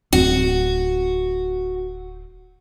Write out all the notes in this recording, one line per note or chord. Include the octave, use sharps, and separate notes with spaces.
D1 C4 F#4